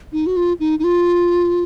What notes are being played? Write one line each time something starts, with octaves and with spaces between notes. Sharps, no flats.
D#4
F#4
F4
D#4
D#4
F4